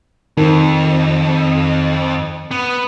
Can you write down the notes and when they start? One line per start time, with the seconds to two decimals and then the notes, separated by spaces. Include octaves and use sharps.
0.37 F2 D#3
2.51 B3